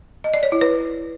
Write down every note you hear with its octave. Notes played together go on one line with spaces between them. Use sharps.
D#5
D5
C#5
E4
B4